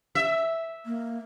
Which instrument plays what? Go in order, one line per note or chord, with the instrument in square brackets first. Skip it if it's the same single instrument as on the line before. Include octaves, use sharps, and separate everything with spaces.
[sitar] E5
[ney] A#3